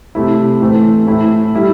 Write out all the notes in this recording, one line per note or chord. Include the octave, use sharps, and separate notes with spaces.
C3 A3 E4
A2 E3 A3 C4
A2 A3 E4
G3 E4